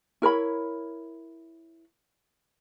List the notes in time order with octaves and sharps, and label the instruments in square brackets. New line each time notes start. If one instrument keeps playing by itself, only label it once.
[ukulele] E4 A#4 C#5 B5